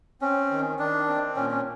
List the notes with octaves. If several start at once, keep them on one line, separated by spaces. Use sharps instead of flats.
C4 C#4
D#3
D#3 D4
C4
A#2 C#4
C#4